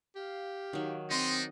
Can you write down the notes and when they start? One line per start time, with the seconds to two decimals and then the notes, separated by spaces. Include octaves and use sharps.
0.16 G4 F5
0.73 D#3 F#3
1.11 C4 D4 D#4 D#5 C6